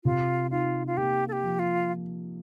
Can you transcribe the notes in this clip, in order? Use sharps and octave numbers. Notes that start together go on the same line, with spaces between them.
C3 F4
D#4 F4
F4
A#3 G4
A4
G4
F3
F4